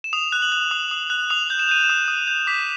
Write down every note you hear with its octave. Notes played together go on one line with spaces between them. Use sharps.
E7
D#6 F7
F#6
F#7
F#6
D#6
D#6
F#6
D#6 F7
G6
E7
G6 D#7
E7
D#6
D#6
G6
D6 B6